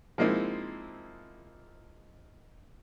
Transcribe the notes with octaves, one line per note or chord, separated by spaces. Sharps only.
F3 G#3 A#3 C4 D#4 E4